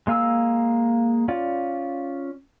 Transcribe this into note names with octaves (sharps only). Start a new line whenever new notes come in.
G#3 A#3 F5 G#5 E6
C#4 F4 D5